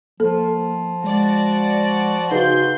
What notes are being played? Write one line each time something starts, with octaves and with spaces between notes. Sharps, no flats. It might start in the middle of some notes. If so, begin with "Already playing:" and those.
F3 A#3 A4
G#3 F#4 D5
C#3 D#4 F#4 B4 C6 G6